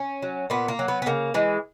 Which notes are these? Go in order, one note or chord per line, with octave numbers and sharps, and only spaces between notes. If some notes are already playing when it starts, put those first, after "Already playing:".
Already playing: C#4
F#3
A#2 B3
A#3
F#3
B3
B3
C#3 A#3
E3 G#3